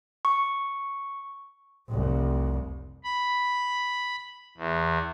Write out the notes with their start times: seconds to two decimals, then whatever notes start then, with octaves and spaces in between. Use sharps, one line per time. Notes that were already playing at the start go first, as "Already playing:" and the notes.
0.25 C#6
1.89 F1 C2
3.04 B5
4.58 E2